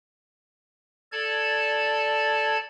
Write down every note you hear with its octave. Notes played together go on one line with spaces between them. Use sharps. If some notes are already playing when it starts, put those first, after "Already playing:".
A4 D5 A5 G#6